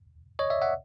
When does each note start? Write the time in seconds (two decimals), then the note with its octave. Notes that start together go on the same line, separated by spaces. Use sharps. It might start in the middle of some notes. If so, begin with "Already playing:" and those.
0.39 C#5 D#5
0.50 D5 E5
0.62 E5 F#5